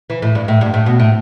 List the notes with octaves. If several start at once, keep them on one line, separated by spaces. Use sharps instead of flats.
E3
A2
G2
A2
G2
A2
B2
A2